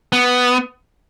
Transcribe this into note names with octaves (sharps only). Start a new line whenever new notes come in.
B3